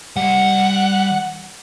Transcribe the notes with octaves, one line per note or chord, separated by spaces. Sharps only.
G3 F#5 C6